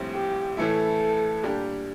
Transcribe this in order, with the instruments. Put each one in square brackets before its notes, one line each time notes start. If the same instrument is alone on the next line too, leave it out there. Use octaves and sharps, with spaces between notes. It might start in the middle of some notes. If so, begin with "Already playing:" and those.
Already playing: [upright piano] A#1 A2 G3 C4
[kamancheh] G4
[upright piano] A2 E3 A3 E4 [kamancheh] A4
[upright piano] A#2 G3 D4 G4